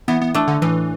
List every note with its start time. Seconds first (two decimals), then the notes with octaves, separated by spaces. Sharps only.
0.08 E3 B3
0.22 B3
0.34 A3 D4
0.48 D3
0.62 A2 E3